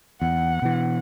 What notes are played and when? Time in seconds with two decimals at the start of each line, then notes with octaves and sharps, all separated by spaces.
0.22 E2 F#5
0.62 B2 E3